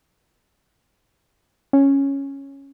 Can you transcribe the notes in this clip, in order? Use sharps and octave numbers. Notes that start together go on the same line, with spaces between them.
C#4